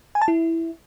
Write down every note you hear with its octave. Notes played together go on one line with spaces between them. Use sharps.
G#5
A5
E4